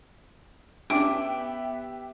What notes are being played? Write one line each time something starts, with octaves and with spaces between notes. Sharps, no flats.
B3 C#4 D4 G4 E5 G5 D6